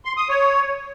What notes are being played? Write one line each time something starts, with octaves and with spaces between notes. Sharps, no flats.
C6
D#6
C#5